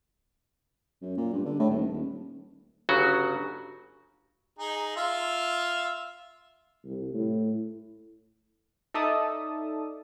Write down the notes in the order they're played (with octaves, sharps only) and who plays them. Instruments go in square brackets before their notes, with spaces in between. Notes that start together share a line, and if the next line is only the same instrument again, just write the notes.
[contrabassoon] F#2
A#2
G2
D3
A2
D#1
D#1
[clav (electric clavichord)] G1 C#3 F#3 F#4
[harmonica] D#4 G#4
F4 E5 F5
[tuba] C2
A2
[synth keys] D#4 A4 D5 E5 A5 D#6